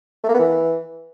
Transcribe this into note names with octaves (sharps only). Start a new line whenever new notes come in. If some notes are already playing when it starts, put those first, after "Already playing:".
A3
A#3
B3
E3